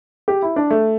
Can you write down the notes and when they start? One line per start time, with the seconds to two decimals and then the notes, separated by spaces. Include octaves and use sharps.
0.28 G4
0.42 E4
0.56 D4
0.70 A3